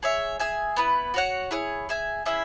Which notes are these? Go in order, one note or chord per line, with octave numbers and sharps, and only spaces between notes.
G#4 C#5 E5
G#4 E5 G#5
B3 E4 B4
F#4 C#5 F#5
E4 G#4 C#5
G#4 E5 G#5
C#4 E4 G#4 E5